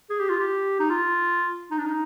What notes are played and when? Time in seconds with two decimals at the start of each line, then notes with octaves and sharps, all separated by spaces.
0.10 G#4
0.20 G4
0.30 F4
0.39 G4
0.80 D#4
0.90 F4
1.71 D#4
1.78 D4
1.85 D#4